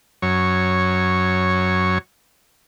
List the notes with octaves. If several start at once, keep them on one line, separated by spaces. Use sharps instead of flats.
F#2 C#5